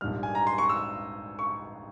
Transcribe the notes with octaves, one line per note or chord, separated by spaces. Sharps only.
A#1 G#2 G3 F6
G#5
A#5
C6
C#6
E6
C#6